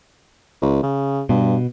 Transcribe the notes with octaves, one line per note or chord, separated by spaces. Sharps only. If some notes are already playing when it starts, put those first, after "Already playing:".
C#2
C#3
G2 B2